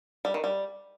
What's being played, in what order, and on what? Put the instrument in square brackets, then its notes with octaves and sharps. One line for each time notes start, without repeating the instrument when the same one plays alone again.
[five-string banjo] G3
D#3
G3